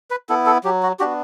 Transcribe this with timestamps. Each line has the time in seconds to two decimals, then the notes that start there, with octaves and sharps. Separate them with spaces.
0.11 B4
0.29 B3 E4 A4
0.46 A4
0.64 F#3 G4
0.83 F#4
1.00 B3 D4 F#4 G4